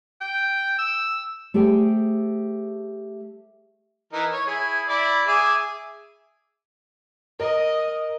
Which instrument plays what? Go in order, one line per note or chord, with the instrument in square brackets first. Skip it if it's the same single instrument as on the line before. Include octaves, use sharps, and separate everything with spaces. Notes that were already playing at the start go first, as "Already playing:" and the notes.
[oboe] G5
E6
[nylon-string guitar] A3 G4 G#4 C5 G5
[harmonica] E3 D#4 A#4
C#5
E4 G#4
E4 D5
G#4 E5 D6
[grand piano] A#4 [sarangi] D#5